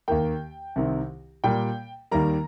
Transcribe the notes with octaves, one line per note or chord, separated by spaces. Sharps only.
D#2 D#3 A#3 G5
C2 C3 D#3 C4
A#2 G3 A#3 G5
D#2 D#3 G3 A#3 A#5